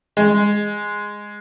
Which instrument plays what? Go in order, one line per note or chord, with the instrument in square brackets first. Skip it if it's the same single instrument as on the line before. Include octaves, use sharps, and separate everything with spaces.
[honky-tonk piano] G#3